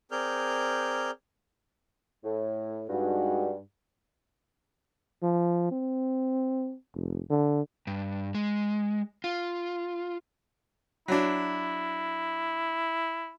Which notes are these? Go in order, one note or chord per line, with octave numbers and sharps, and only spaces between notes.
C4 G#4 A#4 D5 F6 G6
A2
G2 G#3 D#4 F#4
F3
C4
F1
D3
G2
G#3
F4
F#3 D4 E4